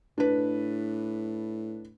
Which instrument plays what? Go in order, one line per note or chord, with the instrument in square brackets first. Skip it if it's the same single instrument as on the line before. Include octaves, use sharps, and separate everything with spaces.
[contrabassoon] A2 [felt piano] D4 B4